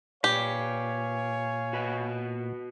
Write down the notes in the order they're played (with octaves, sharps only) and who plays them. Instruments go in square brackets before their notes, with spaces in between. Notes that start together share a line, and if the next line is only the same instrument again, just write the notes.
[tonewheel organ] A#2 [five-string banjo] G4 [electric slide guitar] B4 D5 [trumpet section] C#5 F5 G#5
[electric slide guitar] F#4 B4 D#5